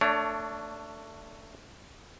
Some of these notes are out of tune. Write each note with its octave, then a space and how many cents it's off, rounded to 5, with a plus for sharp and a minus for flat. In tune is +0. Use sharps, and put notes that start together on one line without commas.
A3 +20 D4 +0 C#5 +25